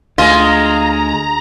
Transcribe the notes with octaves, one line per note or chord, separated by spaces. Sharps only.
D2 G#3 F4 D#5 A#5